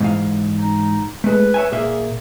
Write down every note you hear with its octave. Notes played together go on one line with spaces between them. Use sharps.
G#2 E3 F5
D#4
G#3 A3 B4
C#5 E5 G#5
A#2 A#3 G#4 E5